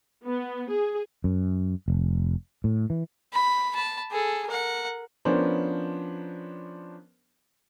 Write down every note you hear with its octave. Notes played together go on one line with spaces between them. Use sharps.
B3
G#4
F#2
F1
A2
E3
B5
A5 B5
G#4 A4
A#4 F#5
F3 B3 C#4 D4 A#4 C5